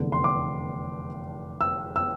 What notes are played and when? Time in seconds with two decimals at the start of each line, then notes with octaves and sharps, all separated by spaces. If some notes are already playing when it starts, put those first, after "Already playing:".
Already playing: F1 E2 D3
0.12 C6
0.24 D6
1.61 E6
1.96 E6